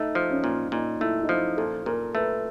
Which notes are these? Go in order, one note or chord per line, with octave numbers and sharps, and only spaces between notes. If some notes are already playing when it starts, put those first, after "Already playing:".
Already playing: A3 D#4
F3
C#4
A#2
A#2 D#4
A3 E4
D#4
F3 E4
A#2 A4
A#2 A#4
A3 B4